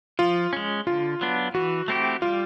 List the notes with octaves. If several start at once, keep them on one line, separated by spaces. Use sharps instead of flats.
F3 F4
G#3 C#4
D3 F4
F#3 B3 D4
E3 F#4
A3 C4 E4 G4
G3 F4